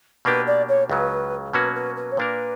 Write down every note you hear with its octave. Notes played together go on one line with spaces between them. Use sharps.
B2 A#3 D4 G4 B4
D5
C#5
C#2 C#3 F#3 B4
B2 F#3 A#3 C#4 F#4 B4
B4
B4
C#5
A#2 A#3 D4 A#4 B4